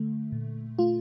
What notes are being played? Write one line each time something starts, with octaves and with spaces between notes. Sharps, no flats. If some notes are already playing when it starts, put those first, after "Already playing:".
Already playing: D3 A3
A#2
A3 F4